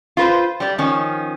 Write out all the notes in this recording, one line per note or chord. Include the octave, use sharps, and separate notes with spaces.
F4 B4 C5
G3 D5
D#3 F3 C#4